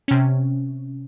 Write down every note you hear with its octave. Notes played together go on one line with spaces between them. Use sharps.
C3 C#4